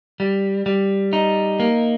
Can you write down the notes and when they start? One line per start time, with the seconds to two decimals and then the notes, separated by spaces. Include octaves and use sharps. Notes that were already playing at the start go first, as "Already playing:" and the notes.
0.20 G3
0.66 G3
1.13 D#4
1.60 A#3